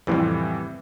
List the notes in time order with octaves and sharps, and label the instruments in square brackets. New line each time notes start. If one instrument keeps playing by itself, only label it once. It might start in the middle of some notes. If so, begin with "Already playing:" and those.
[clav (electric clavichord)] F2 C3 F3 [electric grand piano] A2 E3 G3